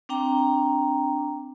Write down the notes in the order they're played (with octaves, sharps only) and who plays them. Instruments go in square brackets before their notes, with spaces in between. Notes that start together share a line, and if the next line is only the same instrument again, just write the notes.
[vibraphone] C4 D4 G5 A#5